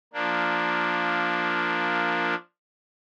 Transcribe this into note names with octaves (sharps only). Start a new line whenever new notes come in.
F3 A#3 D4